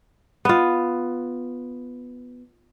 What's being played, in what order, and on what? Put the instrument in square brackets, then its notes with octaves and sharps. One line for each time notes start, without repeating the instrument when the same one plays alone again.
[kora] B3 F4